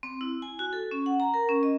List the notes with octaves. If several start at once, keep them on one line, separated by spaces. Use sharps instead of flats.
C4
E4
G#5
F#4
A4
C#4
F#5
A#5
A#4
C#4
D#5